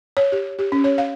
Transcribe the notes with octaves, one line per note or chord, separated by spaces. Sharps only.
C#5
G4
G4
C#4
C#5
F5